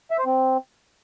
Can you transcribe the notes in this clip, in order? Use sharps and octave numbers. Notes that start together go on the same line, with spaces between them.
E5
C5
C4